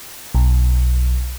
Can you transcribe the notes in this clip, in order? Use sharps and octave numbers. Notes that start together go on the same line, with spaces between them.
B1